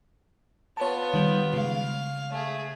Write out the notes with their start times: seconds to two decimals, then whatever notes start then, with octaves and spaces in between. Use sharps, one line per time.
0.77 B3 F4 C#5 A5
1.14 D#3 G3
1.54 C#3 G#3 F5
2.31 A3 G#4